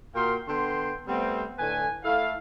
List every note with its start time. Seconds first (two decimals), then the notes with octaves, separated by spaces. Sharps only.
0.15 A#2 F#4 A#4 F5 G5 C6
0.48 D3 B3 G5 C6
1.08 G3 A3 B3 C4
1.58 A2 D3 B4 G#5
2.04 A3 E4 A4 F5